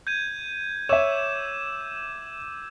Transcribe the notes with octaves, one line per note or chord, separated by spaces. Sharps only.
G6 G#6 D#7
C#5 E5 D6 E6 E7